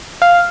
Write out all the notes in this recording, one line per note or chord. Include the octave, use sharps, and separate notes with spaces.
F5